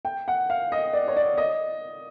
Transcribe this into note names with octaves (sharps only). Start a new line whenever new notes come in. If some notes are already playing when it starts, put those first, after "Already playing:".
G5
F#5
F5
D#5
D5
C#5
D5
D#5